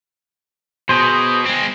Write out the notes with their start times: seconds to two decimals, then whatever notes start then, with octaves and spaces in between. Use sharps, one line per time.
0.89 B2 G#4 C5
1.46 G#3 C4